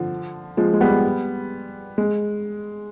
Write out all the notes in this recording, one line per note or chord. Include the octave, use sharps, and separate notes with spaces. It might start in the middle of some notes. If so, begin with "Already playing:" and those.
Already playing: D3 F3
F3 G#3
G#3
G3 B3
G#3